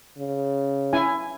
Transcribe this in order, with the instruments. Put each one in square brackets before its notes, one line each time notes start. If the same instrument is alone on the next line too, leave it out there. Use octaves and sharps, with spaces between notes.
[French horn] C#3
[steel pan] C#4 E4 G#5